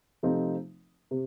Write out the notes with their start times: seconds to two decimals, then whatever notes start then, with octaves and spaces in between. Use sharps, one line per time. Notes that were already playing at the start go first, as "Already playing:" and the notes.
0.23 C3 F3 A3 C4 D#4
1.11 C3